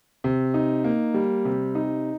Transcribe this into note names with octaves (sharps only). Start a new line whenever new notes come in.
C3
D#4
A#3
G3
C3
D#4